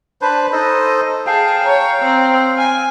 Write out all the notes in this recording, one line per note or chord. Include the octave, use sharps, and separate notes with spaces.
D4 B4 C5 B5
D#4 A4 C5 D#5
G#4 F5 G5 A5
C#5 A#5
C4
G#5 F6